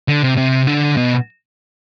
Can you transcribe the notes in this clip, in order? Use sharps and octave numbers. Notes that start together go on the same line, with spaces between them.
D3
C3
C3
D3
B2